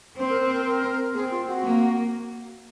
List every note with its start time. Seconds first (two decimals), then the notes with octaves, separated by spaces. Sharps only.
0.17 C4 C5
0.29 A#4
0.41 C5
0.54 A#4
0.66 A#4
1.14 C4 G#4
1.31 F4
1.47 F#4
1.62 A#3